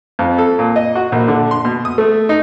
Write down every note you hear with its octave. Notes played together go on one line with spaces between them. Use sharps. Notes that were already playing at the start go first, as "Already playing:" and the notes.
F2
A4
A#2
D#5
F#4
A#1
D3
C6
B2
D#6
A3
D#4